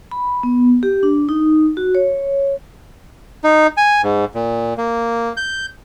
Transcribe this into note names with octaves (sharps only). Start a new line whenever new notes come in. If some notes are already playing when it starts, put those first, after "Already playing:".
B5
B3
G4
D4
D#4
F#4
C#5
D#4
G#5
G#2
A#2
A#3
G6